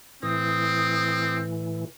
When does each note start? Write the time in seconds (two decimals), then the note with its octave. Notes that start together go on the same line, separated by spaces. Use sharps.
0.23 A2 E3 C4 D#6